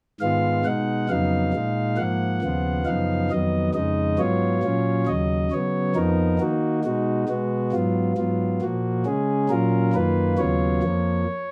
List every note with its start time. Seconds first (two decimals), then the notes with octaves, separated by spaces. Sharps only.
0.21 G#2 D#3 G#3 B3 F4 F5
0.65 B2 G#3 D#4 F#5
1.09 F2 C#3 F#3 B3 D#4 F5
1.53 A#2 G#3 D#4
1.97 G#2 F3 A#3 F#5
2.42 D#2 C#3 F3 B3 F4
2.85 F#2 C#3 F3 B3 D#4 F5
3.30 F2 D#3 F#3 B3 D#5
3.74 F2 C#3 G#3 D#4 D#5
4.19 G#2 F#3 B3 F4 C#5
4.63 A#2 F#3 C#4 F4
5.07 D#2 C#3 F#3 D#5
5.51 C#3 F#3 B3 C#5
5.95 F2 F3 B3 D#4 A#4
6.39 D#3 A#3 D#4 F#4
6.84 B2 G#3 D#4 F#4
7.28 B2 G#3 B3 F#4
7.73 G#2 F#3 B3 F4
8.17 G#2 F#3 B3 F4
8.61 A#2 F3 A#3 F#4
9.06 C#3 G#3 C#4 G#4
9.49 A#2 F#3 C#4 F4 A#4
9.93 F#2 D#3 A#3 F4 B4
10.38 D#2 C#3 F#3 B3 F4 C#5
10.83 F2 F3 A#3